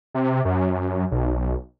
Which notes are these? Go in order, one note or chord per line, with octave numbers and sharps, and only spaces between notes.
C3
F#2
B1